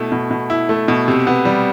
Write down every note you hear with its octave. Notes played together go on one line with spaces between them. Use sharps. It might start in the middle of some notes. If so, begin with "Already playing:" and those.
Already playing: B2 A3 E4
B2
B2
E4
A3
B2
C3
B3
G3